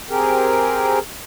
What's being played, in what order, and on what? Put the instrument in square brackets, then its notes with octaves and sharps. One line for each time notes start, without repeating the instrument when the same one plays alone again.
[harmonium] C4 G4 G#4 A#4